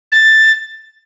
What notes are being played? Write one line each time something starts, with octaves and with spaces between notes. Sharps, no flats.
A6